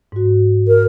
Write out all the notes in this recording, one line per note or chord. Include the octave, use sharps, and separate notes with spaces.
G#2 F#4
A#4